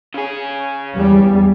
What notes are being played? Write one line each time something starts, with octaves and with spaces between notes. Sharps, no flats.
C#3 G#4
E2 G3